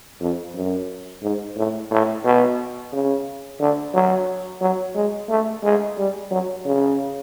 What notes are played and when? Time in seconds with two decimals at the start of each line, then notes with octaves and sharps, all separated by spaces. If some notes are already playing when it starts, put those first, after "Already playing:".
0.20 F2
0.55 F#2
1.22 G#2
1.56 A2
1.91 A2
2.25 B2
2.92 C#3
3.60 D3
3.94 F#3
4.61 F#3
4.95 G#3
5.29 A3
5.63 G#3
5.97 G3
6.30 F#3
6.65 C#3